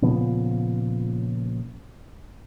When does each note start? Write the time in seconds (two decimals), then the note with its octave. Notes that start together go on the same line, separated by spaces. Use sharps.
0.02 A#2 C#3 F3 B3